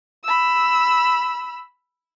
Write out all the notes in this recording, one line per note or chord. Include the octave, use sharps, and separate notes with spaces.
B5 E6